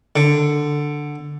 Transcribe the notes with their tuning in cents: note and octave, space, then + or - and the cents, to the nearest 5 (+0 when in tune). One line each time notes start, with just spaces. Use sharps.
D3 +5